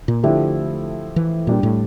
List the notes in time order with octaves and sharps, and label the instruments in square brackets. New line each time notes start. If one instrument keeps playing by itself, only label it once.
[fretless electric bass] A#2
[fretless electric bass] D3 [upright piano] F3 A3 E4 G4
[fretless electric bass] E3
[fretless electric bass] A#2 [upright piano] G3 D4 G4
[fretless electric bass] A2